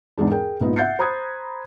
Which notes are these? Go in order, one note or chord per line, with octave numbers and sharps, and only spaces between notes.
E2 G#2 E3 G#3 D4
G#4 A#4 G5
A#1 G#2 B3 D#4 F4
E5 F#5 G6 A6 C7 C#7
C5 A#5 B5 D#6 F#6 G#6